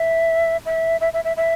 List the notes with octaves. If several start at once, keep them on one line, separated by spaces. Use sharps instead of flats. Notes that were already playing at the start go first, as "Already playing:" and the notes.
Already playing: E5
E5
E5
E5
E5
E5